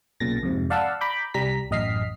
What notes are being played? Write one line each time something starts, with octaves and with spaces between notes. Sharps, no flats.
B1 A#2 C#3 A6 A#6
F2 G#2 C3
D5 F5 F#5 A5 B5 E6
A#5 B5 D6 G6
C2 G3 A#5 B6
A1 F#2 D#5 F6 B6 C7